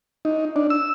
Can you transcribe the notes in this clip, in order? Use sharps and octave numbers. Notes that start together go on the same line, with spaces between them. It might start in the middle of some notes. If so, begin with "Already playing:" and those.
D#4
D4
E6